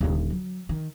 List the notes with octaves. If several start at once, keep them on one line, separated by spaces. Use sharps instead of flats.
D#1 D3
F#3
D#3